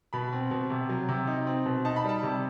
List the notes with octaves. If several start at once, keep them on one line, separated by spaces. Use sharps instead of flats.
B2 B5
C4
B2
C3
F#3
C3
D#4
C4
B2
D#4 A5
B5
G3 A5
C3